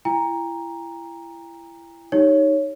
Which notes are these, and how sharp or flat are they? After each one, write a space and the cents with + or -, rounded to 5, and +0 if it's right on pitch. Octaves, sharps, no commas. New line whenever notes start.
E4 +30 G5 +40 A#5 +5
D#4 +0 G4 +0 C#5 +0